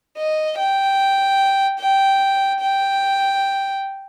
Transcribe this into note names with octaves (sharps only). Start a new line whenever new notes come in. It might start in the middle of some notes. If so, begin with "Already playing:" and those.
D#5
G5
G5
G5